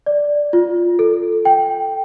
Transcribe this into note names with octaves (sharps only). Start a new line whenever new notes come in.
D5
F4
A4
G5